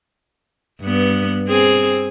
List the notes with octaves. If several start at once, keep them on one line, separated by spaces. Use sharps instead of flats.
G2 B3
C4 G#4